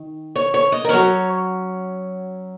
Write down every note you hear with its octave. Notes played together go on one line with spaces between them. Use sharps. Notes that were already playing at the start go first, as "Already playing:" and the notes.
Already playing: D#3
C#5
C#5
D#5
A#4
F#3 C#4 C#5